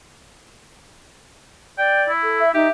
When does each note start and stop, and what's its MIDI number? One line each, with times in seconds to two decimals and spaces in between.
1.78 2.11 74
1.78 2.03 79
2.09 2.54 64
2.23 2.42 69
2.40 2.49 76
2.54 2.68 63
2.54 2.70 67
2.54 2.71 76